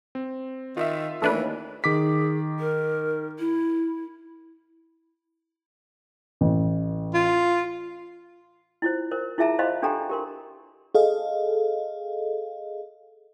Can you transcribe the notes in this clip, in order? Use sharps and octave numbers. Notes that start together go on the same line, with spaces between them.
C4
D#3 F4 E5
D#2 E3 A3 C#4 D4 B4
D#3 G#4 D6 B6
A#4
E4
A1
F4
E4 F4 C5
A#4 C5
E4 F4 G#4 E5 A5 A#5
C5 D#5 F5 B5 C6
D4 G4 A4 G5 A#5 C6
G4 A#4 C6
G#4 A4 D#5 F5